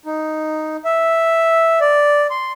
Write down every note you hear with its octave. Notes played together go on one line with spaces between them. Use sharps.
D#4
E5
D5
C6